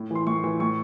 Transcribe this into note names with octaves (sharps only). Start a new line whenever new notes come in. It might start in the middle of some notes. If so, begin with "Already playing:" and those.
Already playing: A2
E3 C6
A2 C#6
E3
A2 C#6